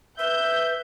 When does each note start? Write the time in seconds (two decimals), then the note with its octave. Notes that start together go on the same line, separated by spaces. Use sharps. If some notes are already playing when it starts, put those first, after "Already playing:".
0.19 B4 E5 G6